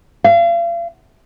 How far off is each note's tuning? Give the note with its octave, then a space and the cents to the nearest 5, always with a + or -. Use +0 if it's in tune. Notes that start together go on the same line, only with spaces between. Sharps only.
F5 -40